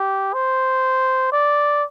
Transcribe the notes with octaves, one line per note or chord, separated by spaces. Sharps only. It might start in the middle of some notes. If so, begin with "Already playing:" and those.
Already playing: G4
C5
D5